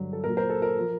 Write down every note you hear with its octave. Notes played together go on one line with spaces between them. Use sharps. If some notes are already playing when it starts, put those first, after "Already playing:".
Already playing: G2 D3 F#3
A4
A#2 F#3 A#4
A#4 C5
A4
A#4
F3